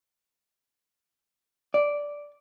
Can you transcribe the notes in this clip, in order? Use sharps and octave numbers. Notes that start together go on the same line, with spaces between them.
D5